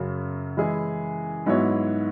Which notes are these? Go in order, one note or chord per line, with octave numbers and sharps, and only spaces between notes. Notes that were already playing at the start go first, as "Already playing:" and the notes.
Already playing: F#2 C#3 F#3
E3 G#3 E4 G#4
G#2 F#3 B3 E4 C#5